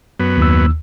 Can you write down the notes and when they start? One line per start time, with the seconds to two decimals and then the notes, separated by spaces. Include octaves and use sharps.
0.20 F#2 B3
0.38 D#2 E6